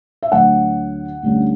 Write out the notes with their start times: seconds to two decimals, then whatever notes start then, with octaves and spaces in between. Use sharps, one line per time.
0.22 E5
0.31 D2 D3 F#3 F#5
1.22 D2 D3 G3 C#4